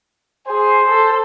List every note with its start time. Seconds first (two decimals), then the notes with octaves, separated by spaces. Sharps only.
0.48 G#4 C5
0.89 A4